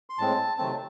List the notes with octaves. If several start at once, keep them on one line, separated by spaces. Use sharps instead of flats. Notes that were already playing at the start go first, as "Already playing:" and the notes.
C6
A2 G#3 C4 A5
C3 D#3 F#3 A3 C4 A5